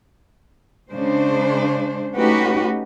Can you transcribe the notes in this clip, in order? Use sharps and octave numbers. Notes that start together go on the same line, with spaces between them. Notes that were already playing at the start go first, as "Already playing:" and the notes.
C#3 G#3 D4 C5
A3 C#4 D#4 F#4 G4 B4